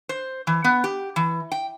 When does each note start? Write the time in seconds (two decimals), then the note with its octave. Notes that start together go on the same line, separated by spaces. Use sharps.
0.09 C5
0.47 E3
0.64 B3
0.84 G4
1.16 E3
1.52 G5